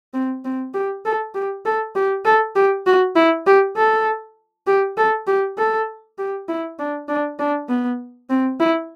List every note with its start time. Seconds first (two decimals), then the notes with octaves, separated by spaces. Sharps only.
0.14 C4
0.45 C4
0.74 G4
1.05 A4
1.35 G4
1.65 A4
1.95 G4
2.25 A4
2.56 G4
2.87 F#4
3.16 E4
3.47 G4
3.77 A4
4.67 G4
4.97 A4
5.27 G4
5.58 A4
6.18 G4
6.48 E4
6.79 D4
7.09 D4
7.39 D4
7.69 B3
8.30 C4
8.60 E4